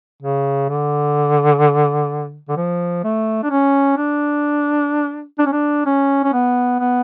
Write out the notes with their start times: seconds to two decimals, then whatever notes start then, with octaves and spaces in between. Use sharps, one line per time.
0.22 C#3
0.69 D3
2.48 D3
2.57 F3
3.04 A3
3.43 D4
3.51 C#4
3.98 D4
5.39 D4
5.46 C#4
5.52 D4
5.86 C#4
6.23 C#4
6.33 B3
6.80 B3